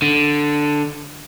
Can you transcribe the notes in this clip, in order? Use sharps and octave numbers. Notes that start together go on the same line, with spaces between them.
D3